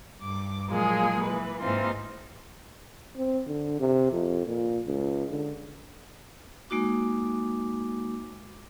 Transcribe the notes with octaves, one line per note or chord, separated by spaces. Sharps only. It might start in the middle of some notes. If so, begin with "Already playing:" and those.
G2 D6
A#2 F3 F#3 G#3 A#3 G#4
E3 B4
G#2 E3 A#3 C4 D#4 F4
C4
D3
C3
F2
A#2
C#2
D3
G#3 A#3 D#4 F#4 D6